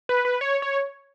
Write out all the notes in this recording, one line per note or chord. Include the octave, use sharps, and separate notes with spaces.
B4
B4
C#5
C#5